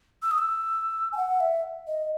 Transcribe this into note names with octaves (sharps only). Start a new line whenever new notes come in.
E6
D#6
E6
G#5
F#5
E5
D#5